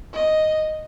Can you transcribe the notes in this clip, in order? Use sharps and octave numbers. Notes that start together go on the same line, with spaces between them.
D#5